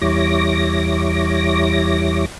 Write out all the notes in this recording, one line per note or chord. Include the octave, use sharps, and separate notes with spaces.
E2 G3 E4 C#5 D6 A#6